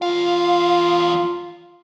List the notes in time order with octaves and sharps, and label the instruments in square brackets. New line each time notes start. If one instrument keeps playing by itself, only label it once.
[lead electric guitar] E2 F5 [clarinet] F4